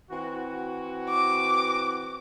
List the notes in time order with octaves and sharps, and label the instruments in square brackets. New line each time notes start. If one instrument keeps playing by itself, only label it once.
[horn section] E3 C4 F#4
[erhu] D6